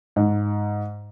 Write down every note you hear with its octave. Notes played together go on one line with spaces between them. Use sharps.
G#2